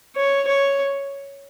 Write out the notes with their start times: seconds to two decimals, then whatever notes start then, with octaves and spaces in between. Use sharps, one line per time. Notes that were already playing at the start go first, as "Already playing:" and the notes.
0.16 C#5
0.48 C#5